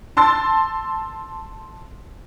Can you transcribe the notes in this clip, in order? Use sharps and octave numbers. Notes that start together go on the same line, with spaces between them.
A5 C6 E6 A6